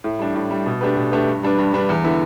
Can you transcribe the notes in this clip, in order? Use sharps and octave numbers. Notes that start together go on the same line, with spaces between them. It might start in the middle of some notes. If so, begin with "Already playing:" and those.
A2
G3 D4
A2
G3 D4
B2
A3 D4 G4 B4
B2
A3 D4 G4 B4
G2
G3 D4 B4
G2
G3 D4 B4
E2
D3 B3 E4